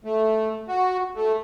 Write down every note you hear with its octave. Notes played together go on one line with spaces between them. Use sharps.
A3
F#4
A3